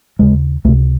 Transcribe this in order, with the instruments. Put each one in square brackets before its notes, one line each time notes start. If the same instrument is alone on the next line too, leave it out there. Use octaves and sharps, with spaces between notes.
[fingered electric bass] D#2 C#3 G#3
C#2 A3
C3